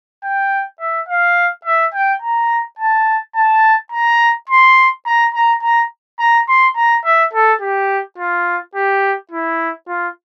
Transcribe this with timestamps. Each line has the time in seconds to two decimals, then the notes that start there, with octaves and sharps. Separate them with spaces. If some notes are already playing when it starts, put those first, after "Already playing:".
0.24 G5
0.80 E5
1.09 F5
1.65 E5
1.94 G5
2.22 A#5
2.79 A5
3.35 A5
3.92 A#5
4.49 C6
5.06 A#5
5.34 A#5
5.63 A#5
6.19 A#5
6.48 C6
6.76 A#5
7.04 E5
7.34 A4
7.61 G4
8.18 F4
8.75 G4
9.32 E4
9.88 F4